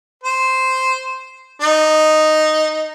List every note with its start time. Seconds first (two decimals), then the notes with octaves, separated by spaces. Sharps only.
0.24 C5
1.62 D#4